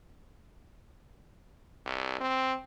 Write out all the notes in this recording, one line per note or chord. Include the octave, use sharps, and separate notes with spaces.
C2
C4